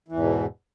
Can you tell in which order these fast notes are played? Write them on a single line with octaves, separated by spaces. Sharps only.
E3 E2 G#2 B2